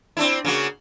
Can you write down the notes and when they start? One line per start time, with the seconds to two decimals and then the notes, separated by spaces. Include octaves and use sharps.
0.17 C4 D4 E4
0.44 C#3 A#3 F#4